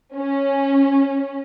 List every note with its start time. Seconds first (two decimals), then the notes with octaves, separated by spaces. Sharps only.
0.15 C#4